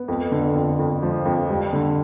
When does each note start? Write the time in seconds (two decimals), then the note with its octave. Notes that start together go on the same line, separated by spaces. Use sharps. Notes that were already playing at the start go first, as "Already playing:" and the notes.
Already playing: B3
0.08 F2
0.32 D3
0.55 F2
0.79 F2
1.03 F3
1.25 F2
1.50 G3
1.73 D3